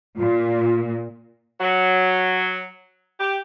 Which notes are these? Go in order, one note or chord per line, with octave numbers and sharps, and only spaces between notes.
A#2 F4
F#3
G4